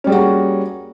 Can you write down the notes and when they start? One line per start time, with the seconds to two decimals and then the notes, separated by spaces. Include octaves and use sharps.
0.04 C#4
0.07 G3
0.10 G#4
0.12 F#4
0.15 A#3